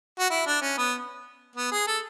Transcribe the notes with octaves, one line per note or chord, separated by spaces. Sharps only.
F#4
E4
D4
C#4
B3
B3
G#4
A4